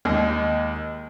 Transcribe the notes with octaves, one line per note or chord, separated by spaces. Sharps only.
D#2 G#3 D#5